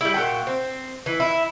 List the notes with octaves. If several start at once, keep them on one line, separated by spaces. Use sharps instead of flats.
G3 E4
A#2 F#4 G5
C4
E3
E4